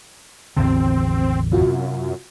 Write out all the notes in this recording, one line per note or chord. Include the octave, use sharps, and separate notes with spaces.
A1 E2 D3 C4
F#2 C3 F4 F#4